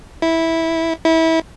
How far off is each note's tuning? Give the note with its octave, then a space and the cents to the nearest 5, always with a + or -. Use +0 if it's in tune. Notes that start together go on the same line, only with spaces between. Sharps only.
E4 -10
E4 -25